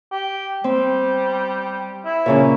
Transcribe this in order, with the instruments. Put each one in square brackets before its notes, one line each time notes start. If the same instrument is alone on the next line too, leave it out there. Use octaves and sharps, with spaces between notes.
[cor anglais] G4
[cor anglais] G3 [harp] C4
[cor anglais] E4
[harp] A#2 C#3 C#4